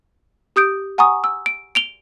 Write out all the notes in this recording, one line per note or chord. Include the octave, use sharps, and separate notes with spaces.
G4 D#6 G6 D7
F#5 G#5 A#5 C#6 D#6
E6
D7
D7 F7 G7